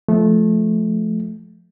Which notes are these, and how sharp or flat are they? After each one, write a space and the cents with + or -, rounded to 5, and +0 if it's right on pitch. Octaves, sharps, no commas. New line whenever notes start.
F3 +0 A3 -20